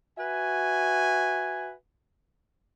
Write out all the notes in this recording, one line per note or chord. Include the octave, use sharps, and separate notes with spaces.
F#4 B4 E5 G#5